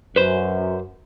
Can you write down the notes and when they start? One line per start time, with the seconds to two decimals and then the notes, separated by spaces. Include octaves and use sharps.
0.16 F#2 B4 C5